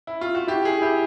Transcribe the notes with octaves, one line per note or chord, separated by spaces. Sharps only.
E4
F4
F#4
E4 G4
G#4
E4 G4